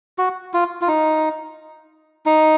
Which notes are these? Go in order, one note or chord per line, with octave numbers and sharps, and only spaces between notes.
F#4
F4
F4
D#4
D#4